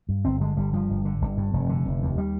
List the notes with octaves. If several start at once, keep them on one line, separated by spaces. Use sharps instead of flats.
G2
G1 C4
D3 G#3
G1 G3
G2 F3
G1
D3
G1
G2
F1
D3
F1
D#2
G3